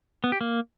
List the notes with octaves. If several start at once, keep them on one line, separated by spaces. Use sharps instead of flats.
B3
G4
A#3